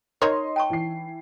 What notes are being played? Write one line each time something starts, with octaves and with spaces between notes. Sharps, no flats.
D#4 A#4 C#5 D#5 C6
G5 A5 C#6
E3 C7